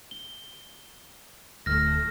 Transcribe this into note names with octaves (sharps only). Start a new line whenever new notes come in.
G7
D1 A3 F6 A#6